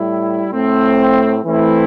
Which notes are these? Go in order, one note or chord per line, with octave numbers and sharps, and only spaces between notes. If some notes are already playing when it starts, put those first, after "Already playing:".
Already playing: A2 G3 E4
A2 A3 C4
E3 A3 C4 E4